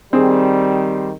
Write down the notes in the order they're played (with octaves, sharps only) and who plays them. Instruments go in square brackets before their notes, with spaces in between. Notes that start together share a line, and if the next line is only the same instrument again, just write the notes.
[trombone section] D#3 G3 [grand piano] C4 G#4